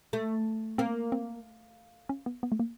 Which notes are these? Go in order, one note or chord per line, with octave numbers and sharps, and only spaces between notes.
A3
A#3 C4
C4
C#4
B3
B3
A3
A#3